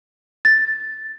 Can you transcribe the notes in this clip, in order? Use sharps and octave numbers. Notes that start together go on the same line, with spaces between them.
A6